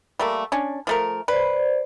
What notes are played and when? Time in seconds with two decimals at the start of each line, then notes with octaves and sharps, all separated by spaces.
0.19 G3 A3 A#3
0.52 C#4 D4
0.87 F3 A3 A#4
1.28 B4 C5 D5